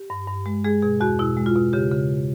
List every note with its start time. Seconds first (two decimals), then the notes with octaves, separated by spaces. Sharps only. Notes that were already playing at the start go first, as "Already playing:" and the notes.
Already playing: G4
0.10 G2
0.28 G2
0.46 G#3
0.64 G#3 G#4
0.82 B2 G#4
1.01 E2 F#4
1.19 B2 E4
1.37 G#3
1.46 F4
1.55 B2
1.73 C#3 G4
1.91 C#3